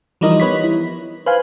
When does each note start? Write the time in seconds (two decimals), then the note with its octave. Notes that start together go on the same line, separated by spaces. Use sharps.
0.21 E3 F3 G3 D#4 A#4 D#5
0.40 B3 B4 C#5 B6
0.64 E4
1.26 B4 C5 F5 G#5